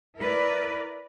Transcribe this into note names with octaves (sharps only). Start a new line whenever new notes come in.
E4 A#4 B4 D5